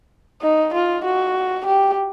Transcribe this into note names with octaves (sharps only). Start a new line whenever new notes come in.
D#4
F4
F#4
G4